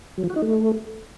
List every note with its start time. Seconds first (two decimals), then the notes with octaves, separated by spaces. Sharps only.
0.18 F#3
0.24 F3
0.30 F#4
0.36 D#4
0.42 A3